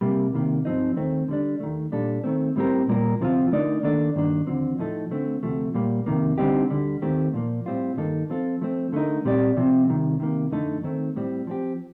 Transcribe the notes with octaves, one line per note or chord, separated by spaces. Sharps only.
C2 C3 G3 A#3
C2 C3 D#3 G3 A#3
G2 F3 C4 D#4
D#2 D#3 A3 C4
D3 G3 D4
D#2 D#3 A3
A#2 G3 D4 A4
D#3 A3 C4
A2 G3 C4 G4 A#4
A#2 G3 A#3 F4 A#4
D2 C3 F3 C4 F4
D3 A3 D#4 A#4 D5
D#3 A#3 D4 A4 D5
G2 D#3 A#3 D4
D#2 D3 F3 C4
A2 F3 A3 D#4 A4
D3 A3 C4
D2 C3 F3 A3
A#2 G3 A#3
F2 C3 D#3 A#3
D3 G3 C4 D#4 G4
D2 D3 G3
D#2 D#3 A3 C4 G4
A#2 F3 A#3
A2 G3 C4 F4
G2 D#3 A#3 D#4 A4
F3 C4 F4 A4
F3 A3 C4
D3 A3 D#4 A#4
A#2 G3 C4 G4 D5
C3 F3 C4
C2 C3 D#3
C3 D#3 A#3
F2 D3 A3 D#4 A4
D#3 A3 C4
A2 G3 C4
F3 C4 G4